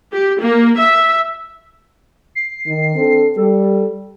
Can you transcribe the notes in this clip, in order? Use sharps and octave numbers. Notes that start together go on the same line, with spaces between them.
G4
A#3
E5
C7
D#3
C4 D4 A4
G3 G4 A4